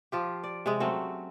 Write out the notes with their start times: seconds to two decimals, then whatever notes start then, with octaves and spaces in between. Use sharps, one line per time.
0.12 F3 F4 G4
0.44 D5
0.66 C3 G#3
0.80 F#3 A3 C4 C#4